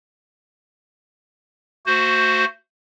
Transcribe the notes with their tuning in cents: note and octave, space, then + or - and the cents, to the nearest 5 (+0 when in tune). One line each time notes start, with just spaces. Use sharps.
A3 +35 F#4 +5 C5 +0